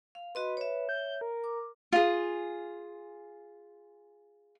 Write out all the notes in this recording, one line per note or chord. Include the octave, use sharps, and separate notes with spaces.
F5
F#4 B4 D#5 C6
C#5 E5
G6
A#4
D6
F4 G#4